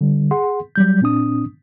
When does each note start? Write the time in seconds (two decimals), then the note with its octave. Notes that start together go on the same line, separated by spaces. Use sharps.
0.01 D3 G3
0.31 G#4 F#5 C6
0.76 F#3 G3 G6
1.01 A#2 C4 D4 D#6